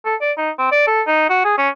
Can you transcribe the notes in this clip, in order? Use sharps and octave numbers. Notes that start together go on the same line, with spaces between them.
A4
D5
D#4
C4
D5
A4
D#4
F#4
G#4
C#4